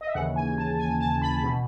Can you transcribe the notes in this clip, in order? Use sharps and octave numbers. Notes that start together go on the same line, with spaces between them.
D#5
E5
D#2 C#3 E3 F#5
G#5
A5
G#5
A5
B5
B2